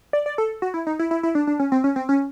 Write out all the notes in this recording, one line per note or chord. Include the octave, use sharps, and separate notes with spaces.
D5
D5
A4
F#4
E4
D#4
E4
E4
E4
D4
D4
C#4
C4
C#4
C4
C#4